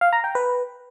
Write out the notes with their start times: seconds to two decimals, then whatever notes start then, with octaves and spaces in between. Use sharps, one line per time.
0.01 F5
0.13 A#5
0.24 G5
0.35 B4